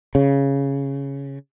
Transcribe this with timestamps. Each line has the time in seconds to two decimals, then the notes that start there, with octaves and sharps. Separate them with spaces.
0.15 C#3